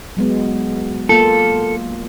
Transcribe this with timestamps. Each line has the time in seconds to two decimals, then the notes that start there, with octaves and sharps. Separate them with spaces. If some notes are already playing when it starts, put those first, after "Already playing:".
0.17 F#3 G#3 B3
1.09 A#3 F4 A4